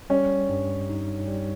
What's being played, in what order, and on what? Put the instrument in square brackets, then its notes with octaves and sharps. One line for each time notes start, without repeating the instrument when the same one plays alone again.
[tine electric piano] G3 [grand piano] C#4
[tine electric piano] G2
D#4
G3